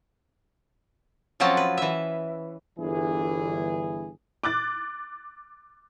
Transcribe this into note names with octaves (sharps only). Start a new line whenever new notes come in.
F3 F#3 C4 C#4 A5
B4
E3 E5
G1 E3 G#4
D6 F#6 A6